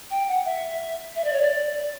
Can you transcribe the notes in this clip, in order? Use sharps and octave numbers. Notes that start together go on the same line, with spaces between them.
G5
F#5
E5
E5
D5
C#5
D5